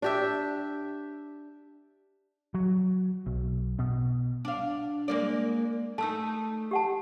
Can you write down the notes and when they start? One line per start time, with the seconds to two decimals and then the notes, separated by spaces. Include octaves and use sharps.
0.02 D4 G4 E5
2.54 F#3
3.26 B1
3.79 B2
4.45 D4 F5
5.08 G#3 A#3 D5
5.98 A3 D#4 A5 E6
6.71 G4 F#5 A5